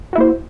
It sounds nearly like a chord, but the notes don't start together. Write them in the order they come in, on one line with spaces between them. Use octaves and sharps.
F#4 E4 A#3 C5